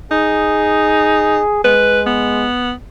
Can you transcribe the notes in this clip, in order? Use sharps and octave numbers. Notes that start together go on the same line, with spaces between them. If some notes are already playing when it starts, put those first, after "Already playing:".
D#4 G#4
G#3 B4
B3